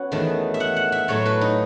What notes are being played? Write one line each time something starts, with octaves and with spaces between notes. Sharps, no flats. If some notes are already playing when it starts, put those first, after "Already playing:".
Already playing: B3 C#4 F#4
E2 D#3 A3
E5
F#5
F#5
E5
A2 F#3 A3 C#5
B4
D#4